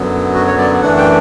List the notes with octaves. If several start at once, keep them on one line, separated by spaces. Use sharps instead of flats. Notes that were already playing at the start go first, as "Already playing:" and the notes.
Already playing: F#2 D3 F#3 B3
F#4
C#5
D5
F#2 E3 A3 D4 F#5
G5